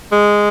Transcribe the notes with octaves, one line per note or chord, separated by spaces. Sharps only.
G#3